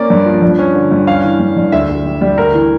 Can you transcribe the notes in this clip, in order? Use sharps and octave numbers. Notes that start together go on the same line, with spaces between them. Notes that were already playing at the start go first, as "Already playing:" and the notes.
Already playing: A#3 C#4 D5
G2
F3
G2
C#4
D3
G2
C#4 F5
E3
G2
G2
D2 E5
D2
G3
G3
D2 A#4
E3